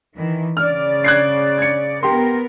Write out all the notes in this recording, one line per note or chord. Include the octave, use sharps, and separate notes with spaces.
D#3 E3
C#3 D5 F6
F#6 G#6 C7
G#6 C#7
B3 G4 A#4 C6